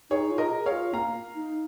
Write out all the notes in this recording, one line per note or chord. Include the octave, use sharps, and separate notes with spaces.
D#4 G#4 C#5
F4
A#4 D#5
G#4
C#5 F5
F4
A#3 F5 A#5
D#4